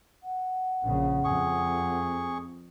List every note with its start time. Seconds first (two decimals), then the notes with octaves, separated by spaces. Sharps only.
0.23 F#5
0.85 A#1 C#3
1.24 F2 G#4 C#6